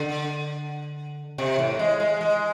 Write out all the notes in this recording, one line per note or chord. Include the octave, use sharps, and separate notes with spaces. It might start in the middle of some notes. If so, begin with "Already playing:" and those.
Already playing: D3
C3
A2
G#3
G#3
G#3